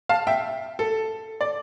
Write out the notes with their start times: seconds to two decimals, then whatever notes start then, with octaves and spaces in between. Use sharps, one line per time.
0.09 F5 A5
0.27 E5 G5
0.79 A4
1.41 D5